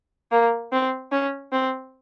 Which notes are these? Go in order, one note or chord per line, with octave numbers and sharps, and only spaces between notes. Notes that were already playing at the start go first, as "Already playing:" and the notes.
A#3
C4
C#4
C4